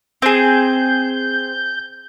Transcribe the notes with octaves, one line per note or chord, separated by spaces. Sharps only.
C4 G#4 G6